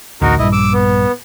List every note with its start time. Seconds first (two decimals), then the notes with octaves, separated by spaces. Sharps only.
0.22 A1 D2 D#4 F#4 A#4
0.39 A#1 G2 E4 D#5
0.52 D6 E6
0.73 B3